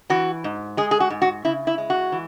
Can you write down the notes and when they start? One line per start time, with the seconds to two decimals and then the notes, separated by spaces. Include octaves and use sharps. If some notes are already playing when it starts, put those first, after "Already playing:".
0.10 E3 F#4
0.44 G#2
0.77 G#3 G#4
0.91 G#4
1.00 F#4
1.10 G#2
1.22 F#4
1.45 C#3 E4
1.67 E4
1.78 G#3
1.90 F#4
2.12 E3